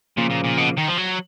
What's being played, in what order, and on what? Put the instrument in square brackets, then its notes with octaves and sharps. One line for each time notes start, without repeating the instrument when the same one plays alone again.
[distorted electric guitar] A#2 [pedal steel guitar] C#3 F3 A#3
[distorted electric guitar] A#2
A#2
B2
D#3
F3
F#3